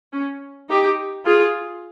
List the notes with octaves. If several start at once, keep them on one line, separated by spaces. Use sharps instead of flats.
C#4
D#4 G4
F4 G#4